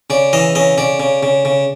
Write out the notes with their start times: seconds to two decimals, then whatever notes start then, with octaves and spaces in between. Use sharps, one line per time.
0.10 C#3 D5
0.33 E3 D#5
0.55 C#3 D#5
0.78 C#3 D5
1.00 C#3
1.23 C#3
1.45 C#3